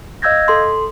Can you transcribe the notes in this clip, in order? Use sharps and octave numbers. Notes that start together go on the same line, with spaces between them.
D#5 F5 E6 G6 G#6 A#6
A4 C6